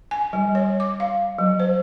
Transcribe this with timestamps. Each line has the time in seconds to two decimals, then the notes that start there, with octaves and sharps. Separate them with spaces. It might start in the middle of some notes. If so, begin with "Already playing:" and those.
0.11 G#5
0.33 G3
0.55 C#5
0.80 D6
1.00 F5
1.38 F#3
1.60 C5